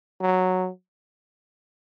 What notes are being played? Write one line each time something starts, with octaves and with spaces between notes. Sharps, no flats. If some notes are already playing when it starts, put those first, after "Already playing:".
F#3